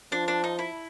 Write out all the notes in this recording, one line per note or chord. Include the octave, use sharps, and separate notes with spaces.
F3 D4
D4
D#4
E4